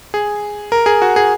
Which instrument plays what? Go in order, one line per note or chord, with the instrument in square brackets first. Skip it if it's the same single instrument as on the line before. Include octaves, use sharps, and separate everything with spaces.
[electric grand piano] G#4
A#4
G#4
F#4
G#4